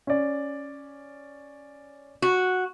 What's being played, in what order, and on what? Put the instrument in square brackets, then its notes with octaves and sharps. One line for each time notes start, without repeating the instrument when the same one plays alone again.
[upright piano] C#4 D5
[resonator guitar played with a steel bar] F#4